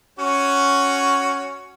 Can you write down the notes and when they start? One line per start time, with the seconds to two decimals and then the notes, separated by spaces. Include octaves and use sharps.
0.19 C#4 F#4 C#5